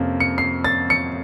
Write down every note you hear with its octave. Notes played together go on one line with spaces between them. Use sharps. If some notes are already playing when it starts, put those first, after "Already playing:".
Already playing: F2 C3 F3 A#3 C#4
C#7
C7
A6
C#7